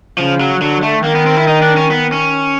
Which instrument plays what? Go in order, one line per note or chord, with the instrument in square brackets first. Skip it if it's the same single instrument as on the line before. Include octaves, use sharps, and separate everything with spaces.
[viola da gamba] C#3 [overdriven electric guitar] F3
[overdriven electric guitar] F#3
[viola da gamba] D3 [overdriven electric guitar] F#3
[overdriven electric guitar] A3
[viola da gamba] D#3 [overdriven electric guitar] A#3
[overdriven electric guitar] B3
C4
E4
D#4
D4
C#4
B3
C#4